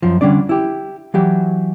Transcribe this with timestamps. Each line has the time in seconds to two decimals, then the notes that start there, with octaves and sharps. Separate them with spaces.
0.02 F#2 F3
0.21 D3 G3 C#4 D4 D5
0.49 E4 G4
1.14 E3 F#3 G4